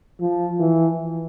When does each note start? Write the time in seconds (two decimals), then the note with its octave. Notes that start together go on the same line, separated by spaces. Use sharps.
0.20 F3
0.60 E3